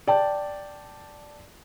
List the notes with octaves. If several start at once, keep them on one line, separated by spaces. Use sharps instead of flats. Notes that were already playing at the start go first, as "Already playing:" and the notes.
D5 G5 A5